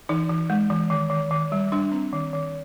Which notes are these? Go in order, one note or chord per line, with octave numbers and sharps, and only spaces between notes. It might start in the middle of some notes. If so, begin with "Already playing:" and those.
E3 D#4
E3
G#3
E3
D#3
D#3
D#3
G3
G3 D4
C4
D#3
D#3